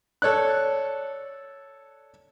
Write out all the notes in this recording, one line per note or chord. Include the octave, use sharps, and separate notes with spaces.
A4 C#5 D5 F#6